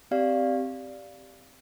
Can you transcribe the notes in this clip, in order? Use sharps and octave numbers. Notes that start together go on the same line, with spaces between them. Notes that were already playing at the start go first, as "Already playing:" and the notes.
C4 G4 D5 F5